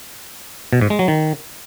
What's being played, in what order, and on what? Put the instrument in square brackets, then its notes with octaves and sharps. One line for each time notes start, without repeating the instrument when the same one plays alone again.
[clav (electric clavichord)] B2
G#2
G#3
F#3
D#3